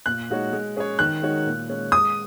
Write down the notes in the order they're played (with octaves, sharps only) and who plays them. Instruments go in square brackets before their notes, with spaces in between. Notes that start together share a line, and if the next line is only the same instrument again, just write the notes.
[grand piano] A#2 [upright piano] F#6
[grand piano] G#3 D#4 F#4 C#5
G#3
C#4 G#4 C#5
[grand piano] D#3 [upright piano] F#6
[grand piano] G#3 D#4 F#4 C#5
A#2
G#3 C#4
[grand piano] G#3 [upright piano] D#6